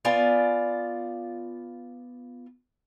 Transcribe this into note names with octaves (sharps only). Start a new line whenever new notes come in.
B3 F4 D5 G#5